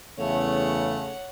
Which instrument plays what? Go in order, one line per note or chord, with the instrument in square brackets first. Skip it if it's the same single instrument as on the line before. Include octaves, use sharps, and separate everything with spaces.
[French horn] E2 [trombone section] C#3 A3 [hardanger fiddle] C#5 F#5